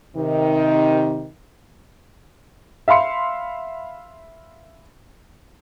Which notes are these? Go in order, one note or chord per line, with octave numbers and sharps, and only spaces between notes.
C3 D#3 D#4
E5 F5 B5 C6 C#7